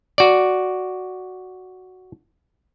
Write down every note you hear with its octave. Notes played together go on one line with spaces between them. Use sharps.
F#4 D5